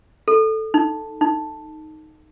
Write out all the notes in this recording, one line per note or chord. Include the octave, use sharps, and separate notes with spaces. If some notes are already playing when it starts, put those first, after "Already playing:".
A4
D#4
D#4